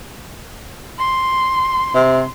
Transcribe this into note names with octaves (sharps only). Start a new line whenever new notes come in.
C6
C3